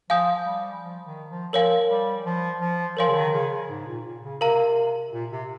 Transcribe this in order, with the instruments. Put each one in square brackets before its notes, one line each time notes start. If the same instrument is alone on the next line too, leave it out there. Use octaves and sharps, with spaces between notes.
[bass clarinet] F3 [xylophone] F5 G#5 D#6 G6
[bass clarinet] G3
F3
D#3
F3
[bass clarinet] F3 [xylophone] A#4 C#5 F5 G#5
[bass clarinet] G3
F3
F3
[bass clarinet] F3 [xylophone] A#4 C#5 F5 G#5 C6
[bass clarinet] C#3
D#3
C#3
C#3
G#2
A#2
A#2
C#3
[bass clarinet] C3 [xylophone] A#4 F5 A#5
[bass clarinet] A#2
C3